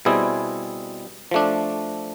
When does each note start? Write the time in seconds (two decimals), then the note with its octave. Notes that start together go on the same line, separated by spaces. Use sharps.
0.05 B2 G3 C4 E4 G#4
1.31 F3 A3 D4